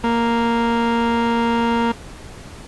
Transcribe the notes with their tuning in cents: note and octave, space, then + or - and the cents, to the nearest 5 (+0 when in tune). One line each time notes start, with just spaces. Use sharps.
A#3 +0